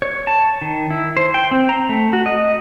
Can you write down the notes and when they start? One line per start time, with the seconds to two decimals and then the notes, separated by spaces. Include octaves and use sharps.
0.02 C#5
0.27 A5
0.61 D#3
0.90 E4
1.17 C5
1.34 G5
1.51 C4
1.69 A#5
1.89 A3
2.13 F#4
2.26 D#5